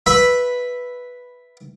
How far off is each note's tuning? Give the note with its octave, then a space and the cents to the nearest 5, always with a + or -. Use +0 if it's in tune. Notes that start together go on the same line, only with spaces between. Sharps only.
B4 -5 E5 +0 B5 +0